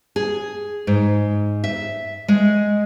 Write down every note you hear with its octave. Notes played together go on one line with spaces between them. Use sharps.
G#4
G#2
E5
G#3